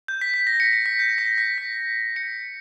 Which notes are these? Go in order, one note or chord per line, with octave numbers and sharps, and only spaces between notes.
G6
B6
B6
A#6
C#7
C#7
B6
G6
A#6
B6
B6
C#7